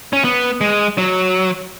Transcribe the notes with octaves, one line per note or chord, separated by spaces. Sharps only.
C#4
B3
G#3
F#3